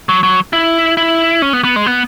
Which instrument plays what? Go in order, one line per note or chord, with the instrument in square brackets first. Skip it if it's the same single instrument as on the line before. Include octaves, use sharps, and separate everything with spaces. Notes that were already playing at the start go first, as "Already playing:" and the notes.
[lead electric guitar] F#3
F#3
E4
E4
C#4
B3
B3
G#3
B3